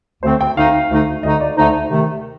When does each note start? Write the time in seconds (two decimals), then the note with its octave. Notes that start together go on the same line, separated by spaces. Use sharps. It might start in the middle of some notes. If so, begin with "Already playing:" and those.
0.23 D2 D3 A3 C4 C5
0.41 G5
0.56 D2 D3 A3 D#4 F5
0.90 D2 D3 A3 D#4
1.23 D2 D3 A3 D#4 D#5
1.40 D5
1.57 D2 D3 A3 D#4 C5
1.90 C3 D#3 A3